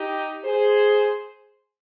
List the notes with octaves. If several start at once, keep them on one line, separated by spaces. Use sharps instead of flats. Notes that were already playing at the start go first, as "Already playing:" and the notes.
Already playing: D#4 G4
G#4 C5